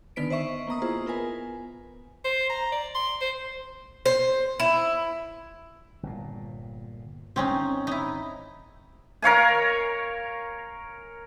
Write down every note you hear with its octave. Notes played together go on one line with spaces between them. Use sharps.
D3 D#3 B3 B4 B6 D7
C5 D#5 E5 C#6
A#3 B3 A#5 D#6
E4 F4 G#4 C5
B3 A#4 B4 G#5
C5
A#5
D5
C6
C5
C5
E4
G1 A#2
G1 G2 C4 C#4 D#4
D#4 E4
A#4 C#5 F5 G#5